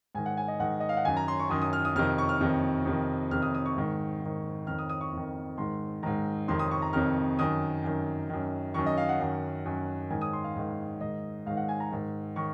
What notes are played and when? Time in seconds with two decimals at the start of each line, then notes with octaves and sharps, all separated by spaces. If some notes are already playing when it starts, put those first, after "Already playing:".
0.15 G#2 D#3 G#5
0.26 F#5
0.37 G#5
0.48 D#5
0.60 G#2 D#3 F#5
0.80 D#5
0.89 F5
0.97 F#5
1.04 F#2 D#3 G#5
1.17 A#5
1.28 C6
1.39 C#6
1.50 F#2 D#3 D#6
1.62 D#6
1.73 F6
1.85 D#6
1.96 F2 C3 D#3 F6
2.18 C#6
2.29 F6
2.40 F2 C3 D#3
2.85 F2 C3 D#3
3.31 F2 C3 D#3 F6
3.42 D#6
3.55 D#6
3.66 C#6
3.77 G#2 D#3
4.21 G#2 D#3
4.67 F2 D#3 F6
4.78 D#6
4.89 D#6
5.01 C#6
5.13 F2 D#3
5.57 G#2 D#3 C6
6.03 G#2 D#3 A#5
6.48 F2 C3 D#3 C6
6.59 D#6
6.71 C#6
6.82 A#5
6.93 F2 C3 D#3 F6
7.39 F#2 D#3 D#6
7.84 F#2 D#3
8.30 F#2 D#3
8.74 F#2 D#3 C#6
8.86 D#5
8.97 F5
9.09 F#5
9.20 F#2 D#3
9.66 F#2 D#3
10.10 G#2 D#3 G#5
10.21 D#6
10.33 C6
10.44 F5
10.56 G#2 D#3
11.01 G#2 D#3 D#5
11.46 G#2 D#3 F5
11.57 F#5
11.68 G#5
11.80 A#5
11.92 G#2 D#3
12.36 D#3 C#6